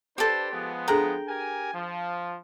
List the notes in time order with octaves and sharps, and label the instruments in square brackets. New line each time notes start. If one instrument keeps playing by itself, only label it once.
[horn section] D4 B4 C5 [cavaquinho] G4 A4
[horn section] F3 G#3 B3
[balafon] D4 G#4 A4 [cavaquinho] G5 A#5
[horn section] G4 A#4 G#5
F3